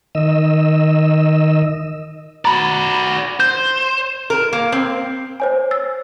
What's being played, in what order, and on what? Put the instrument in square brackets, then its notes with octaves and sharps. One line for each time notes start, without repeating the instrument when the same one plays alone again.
[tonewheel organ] D#3 D#5 E6
[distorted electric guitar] F#4 D5 [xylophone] A#5 B5
[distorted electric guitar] C5 [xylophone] G6
[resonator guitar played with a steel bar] A#4
A#3
C4
[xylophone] C5 C#5 G#5
E6 A6